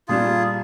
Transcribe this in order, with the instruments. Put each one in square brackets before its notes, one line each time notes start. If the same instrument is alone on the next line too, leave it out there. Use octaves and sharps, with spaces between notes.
[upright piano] A#2 G3 D4 [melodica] F4 G#4